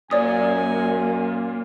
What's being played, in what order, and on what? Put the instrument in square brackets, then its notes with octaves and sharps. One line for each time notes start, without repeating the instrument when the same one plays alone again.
[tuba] F#2 [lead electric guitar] A#2 [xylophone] C#5 D5 D#6 [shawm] G#5